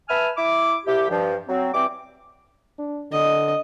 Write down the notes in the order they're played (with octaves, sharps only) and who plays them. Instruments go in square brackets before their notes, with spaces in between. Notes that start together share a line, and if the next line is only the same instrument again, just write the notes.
[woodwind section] B4 E5 G#5 A5 F6
E4 D6
C2 E4 G4
G2 F3
F#3 C4
E3 G3 C4 D6
[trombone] D4
[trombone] D3 [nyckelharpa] D#5